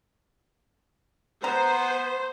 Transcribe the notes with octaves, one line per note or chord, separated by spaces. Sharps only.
B3 C5 A#5